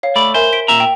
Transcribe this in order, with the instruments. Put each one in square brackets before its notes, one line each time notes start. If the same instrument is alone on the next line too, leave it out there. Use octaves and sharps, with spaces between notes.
[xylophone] C#5 F5
[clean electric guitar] A3 D5 [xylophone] B5
[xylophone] A#4 E5 G#5 [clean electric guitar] C5
[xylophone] B6 D7
[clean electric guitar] A#2 E5 A#5
[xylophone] G5